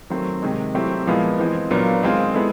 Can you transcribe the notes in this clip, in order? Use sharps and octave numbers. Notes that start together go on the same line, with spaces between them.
D#3 F#3 A3 C4
C3 D#3 G#3
F#3 A3 C4 E4 G4
A#2 F3 G#3 B3 E4
E3 G#3 C4
A#2 F#3 B3 D4 F4
D#3 G#3 C4 F4 G#4
G#3 B3 E4 A4